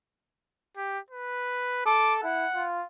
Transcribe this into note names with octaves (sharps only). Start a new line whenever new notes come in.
G4
B4
A4 D6
E4 F#5
F4